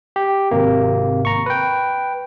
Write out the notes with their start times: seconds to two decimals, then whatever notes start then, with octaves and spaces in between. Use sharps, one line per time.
0.16 G4
0.51 G#1 C3 A#3
1.25 A#5 C#6
1.46 B4 G5